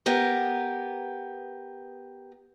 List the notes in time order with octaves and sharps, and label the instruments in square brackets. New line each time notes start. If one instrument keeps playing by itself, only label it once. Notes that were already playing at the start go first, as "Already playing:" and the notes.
[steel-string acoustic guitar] B3 G4 A#4